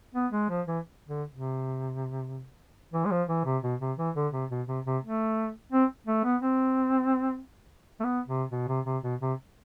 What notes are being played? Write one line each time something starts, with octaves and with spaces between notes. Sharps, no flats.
B3
G#3
F3
E3
D3
C3
E3
G#3
F3
E3
C3
B2
C3
E3
D3
C3
B2
C3
C3
A3
C4
A3
B3
C4
A3
B3
C3
B2
C3
C3
B2
C3